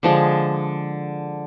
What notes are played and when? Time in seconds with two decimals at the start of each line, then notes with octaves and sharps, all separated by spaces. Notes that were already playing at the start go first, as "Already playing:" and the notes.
0.03 D3 F3 G#3